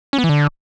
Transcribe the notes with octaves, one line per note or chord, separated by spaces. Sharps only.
C#4
B3
E3
D3